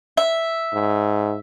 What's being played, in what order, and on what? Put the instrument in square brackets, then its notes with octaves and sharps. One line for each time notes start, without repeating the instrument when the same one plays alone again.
[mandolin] E5
[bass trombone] G#2